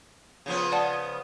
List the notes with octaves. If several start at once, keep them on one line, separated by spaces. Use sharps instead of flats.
C#3 F3 B3
D5 F#5 A5